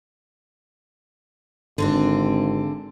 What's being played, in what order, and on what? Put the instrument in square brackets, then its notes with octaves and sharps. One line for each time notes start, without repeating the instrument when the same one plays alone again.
[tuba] G#1 [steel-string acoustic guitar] D3 C4 D4